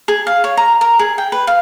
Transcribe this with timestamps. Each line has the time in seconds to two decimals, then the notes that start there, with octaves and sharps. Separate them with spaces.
0.08 G#4
0.27 F5
0.44 C#5
0.57 A#5
0.81 A#4
0.99 G#4
1.18 G5
1.32 B4
1.47 F5